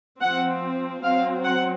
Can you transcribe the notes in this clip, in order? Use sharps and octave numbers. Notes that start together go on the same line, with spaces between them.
F3 C4 F#5
F#3 C4 F5
F#5